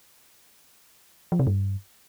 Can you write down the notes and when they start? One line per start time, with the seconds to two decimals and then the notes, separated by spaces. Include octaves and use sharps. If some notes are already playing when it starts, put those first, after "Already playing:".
1.32 F3
1.39 C3
1.47 G2